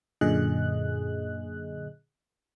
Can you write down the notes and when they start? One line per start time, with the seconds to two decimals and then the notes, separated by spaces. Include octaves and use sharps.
0.21 F#2 A#2 D3 G#4 D#5 F#6